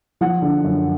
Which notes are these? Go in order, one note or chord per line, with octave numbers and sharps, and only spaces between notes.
F3 F#5
D3
F#2